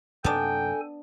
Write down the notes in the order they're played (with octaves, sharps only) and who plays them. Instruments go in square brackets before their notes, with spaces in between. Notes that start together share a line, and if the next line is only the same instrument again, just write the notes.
[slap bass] F#2 C3 A#3 [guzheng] B3 D4 [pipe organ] A4 G#5 [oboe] G5